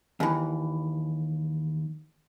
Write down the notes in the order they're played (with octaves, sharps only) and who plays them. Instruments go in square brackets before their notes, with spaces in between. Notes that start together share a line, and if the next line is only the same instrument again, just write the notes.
[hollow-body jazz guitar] D#2 E3